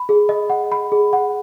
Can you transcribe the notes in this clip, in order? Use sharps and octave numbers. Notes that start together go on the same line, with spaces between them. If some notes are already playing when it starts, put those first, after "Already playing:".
Already playing: B5
G#4
D#5
F#5
B5
G#4
F#5